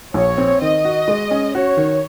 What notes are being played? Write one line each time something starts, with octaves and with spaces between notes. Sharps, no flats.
A#1 C#5
C4
D#3 D#5
F#4
G#3
C#4
F#4 C#5
D#3